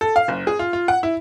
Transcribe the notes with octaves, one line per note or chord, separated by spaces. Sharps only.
A4
F5
F#1
G#4
F4
F4
F#5
E4